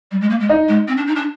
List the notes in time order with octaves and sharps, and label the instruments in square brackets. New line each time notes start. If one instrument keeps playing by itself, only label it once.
[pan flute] G3
G#3
A#3
G#3
[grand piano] D#4
[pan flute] G#3
C4
D4
D#4
D4